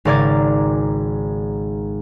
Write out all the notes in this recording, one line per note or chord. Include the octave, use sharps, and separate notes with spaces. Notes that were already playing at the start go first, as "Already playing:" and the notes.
G#1 C#3 A#4 D5 D6 G#6